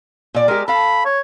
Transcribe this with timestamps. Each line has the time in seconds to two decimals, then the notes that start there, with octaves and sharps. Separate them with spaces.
0.34 A#2 D5
0.48 G#3 G4 A#4
0.68 A4 F5 B5
1.05 C#5